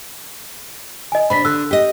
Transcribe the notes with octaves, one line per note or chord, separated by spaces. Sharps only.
D#5 G#5
C3 D4 B5 B6
D3 E6 F#6
G4 D#5